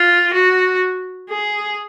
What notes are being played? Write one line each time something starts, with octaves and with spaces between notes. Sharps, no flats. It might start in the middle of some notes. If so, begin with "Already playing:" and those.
Already playing: F4
F#4
G#4